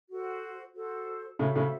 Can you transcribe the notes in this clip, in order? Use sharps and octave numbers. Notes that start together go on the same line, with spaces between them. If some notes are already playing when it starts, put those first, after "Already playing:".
F#4 A4 C5
F#4 A4 C5
A2 C#3 F#4 A4 C5 E5
A2 C#3